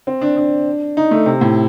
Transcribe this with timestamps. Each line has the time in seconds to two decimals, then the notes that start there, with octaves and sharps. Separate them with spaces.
0.07 C4
0.21 D4
0.37 D4
0.97 D#4
1.11 A3
1.26 C3
1.41 A2